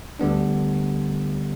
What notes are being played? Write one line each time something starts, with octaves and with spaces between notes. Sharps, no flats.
D2 D3 G3 B3 D4